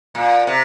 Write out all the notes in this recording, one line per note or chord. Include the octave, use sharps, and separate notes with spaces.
A#2
C3